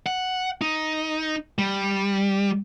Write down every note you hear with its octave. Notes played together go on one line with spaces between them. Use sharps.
F#5
D#4
G3